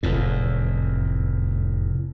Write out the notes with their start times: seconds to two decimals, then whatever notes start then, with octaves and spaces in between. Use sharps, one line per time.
0.03 F1 E2 A2